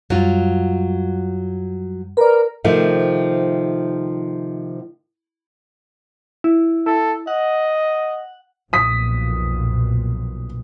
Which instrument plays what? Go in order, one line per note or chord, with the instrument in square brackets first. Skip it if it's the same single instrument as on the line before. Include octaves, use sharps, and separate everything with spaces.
[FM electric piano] F#2 G3 [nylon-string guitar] F#3 F4
[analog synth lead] A#4 [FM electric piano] B4 D5
[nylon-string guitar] C3 D#3 F3 A3 C4
[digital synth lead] E4
[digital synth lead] E4 [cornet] A4
[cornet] D#5 [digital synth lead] F#5
[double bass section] B1 F2 A#2 [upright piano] D#6 B6